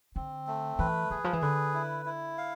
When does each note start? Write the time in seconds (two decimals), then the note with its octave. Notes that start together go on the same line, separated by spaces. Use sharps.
0.16 D3 C4
0.47 A3
0.79 E3 B4
1.10 E3 G#4
1.24 F3
1.33 E3
1.42 D3 B4
1.74 E4
2.05 E4
2.38 F5